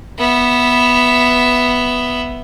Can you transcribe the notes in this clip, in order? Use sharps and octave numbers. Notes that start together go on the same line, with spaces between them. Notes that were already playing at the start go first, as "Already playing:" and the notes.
B3 E5